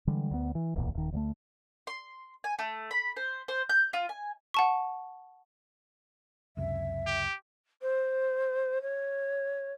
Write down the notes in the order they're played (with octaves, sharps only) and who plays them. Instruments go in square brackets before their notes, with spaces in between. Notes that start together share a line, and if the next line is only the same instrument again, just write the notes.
[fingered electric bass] D3 E3 G3 G#3
D2 B3
E3
D1 B1 E2 A#2
D#1 D#3
D2 F#3 A3
[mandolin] C6
G#5
A3
B5
C5
C5
G6
F4
G#5
[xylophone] F#5 A5 C#6
[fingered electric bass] C#2 F#2 C3 [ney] E5
[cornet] G4
[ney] C5
C#5